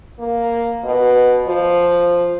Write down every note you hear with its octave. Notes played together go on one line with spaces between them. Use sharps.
A#3
B2
F3